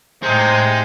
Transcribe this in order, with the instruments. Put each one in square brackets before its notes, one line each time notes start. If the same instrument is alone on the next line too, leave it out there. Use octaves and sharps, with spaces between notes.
[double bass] A2 [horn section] C3 D#4 [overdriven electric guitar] G#3 [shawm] C5